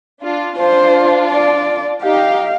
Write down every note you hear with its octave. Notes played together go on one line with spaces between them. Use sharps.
D4 F4
D4 F4 C5
D5
D#4 G4 F5